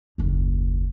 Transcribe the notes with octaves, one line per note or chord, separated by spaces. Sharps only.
F#1 D#2